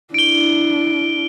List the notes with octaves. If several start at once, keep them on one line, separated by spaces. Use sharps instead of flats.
D4 E4 D7 G7